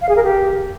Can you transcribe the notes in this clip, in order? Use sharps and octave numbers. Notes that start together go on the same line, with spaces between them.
F5
G#4
A#4
G4